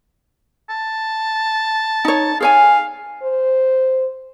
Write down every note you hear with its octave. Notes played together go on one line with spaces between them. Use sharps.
A5
D#4 C#5
G#4 C#5 F5 G#5
C5